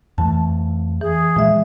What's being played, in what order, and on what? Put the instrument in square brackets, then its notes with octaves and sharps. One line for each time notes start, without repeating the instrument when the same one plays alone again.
[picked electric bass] F2 E3 A3 [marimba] A5
[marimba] E3 [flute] G#4
[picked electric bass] A#2 G#3 [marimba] F3 E5